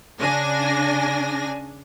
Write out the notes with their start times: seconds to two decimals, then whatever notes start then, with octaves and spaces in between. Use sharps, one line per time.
0.19 C#3 D4 G#5 A#6